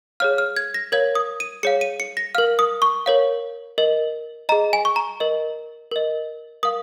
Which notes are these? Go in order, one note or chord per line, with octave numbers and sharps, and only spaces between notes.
G#4 C#5 F5 F6
F6
G#6
A#6
A#4 C#5 F5 G#6
D#6
D#7
G#4 C#5 F5 C#7
D#7
C#7
A#6
A#4 F5 F6
D#6
C#6
A#4 C#5 F5
A#4 D#5
G#4 D#5 A#5
G#5
C#6
A#5
A#4 D#5
A#4 D#5
A#4 F5 D#6